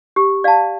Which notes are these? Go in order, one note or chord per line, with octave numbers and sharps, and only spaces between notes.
G4
D5 F5 A5